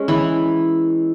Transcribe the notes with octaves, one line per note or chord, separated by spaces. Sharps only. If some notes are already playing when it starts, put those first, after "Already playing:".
Already playing: G#3 C#4
E3 E4